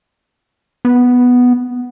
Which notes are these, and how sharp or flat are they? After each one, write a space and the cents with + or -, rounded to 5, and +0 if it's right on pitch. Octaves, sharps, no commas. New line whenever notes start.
B3 +0